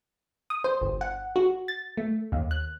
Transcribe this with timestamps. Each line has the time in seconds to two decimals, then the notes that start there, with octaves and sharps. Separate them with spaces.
0.50 D#6
0.64 C5
0.81 G1
1.01 F#5
1.36 F#4
1.68 A6
1.97 A3
2.32 D#2
2.51 F#6